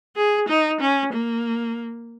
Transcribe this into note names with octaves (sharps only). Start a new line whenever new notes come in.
G#4
D#4
C#4
A#3